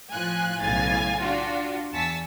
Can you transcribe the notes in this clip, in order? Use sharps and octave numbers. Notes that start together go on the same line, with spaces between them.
A2 F3 F4 G#5 F#6
B1 A2 C#3 F5 G#5 A6
D4 F4 F#4
E2 G#5 A5 C#6 E6 B6